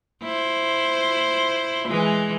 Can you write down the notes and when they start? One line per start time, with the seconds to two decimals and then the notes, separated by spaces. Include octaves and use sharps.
0.23 E4 C5
1.88 E3 G#3